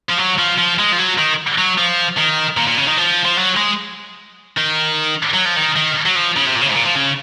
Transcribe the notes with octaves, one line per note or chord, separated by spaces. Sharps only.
F3
F#3
F3
F3
G#3
F3
F#3
D#3
F#3
F3
D#3
A#2
A#2
C#3
D#3
F3
F3
F#3
G#3
D#3
F#3
F3
D#3
D#3
F#3
F3
C#3
C3
A#2
C#3
C3
G#2
A#2
F3
C#3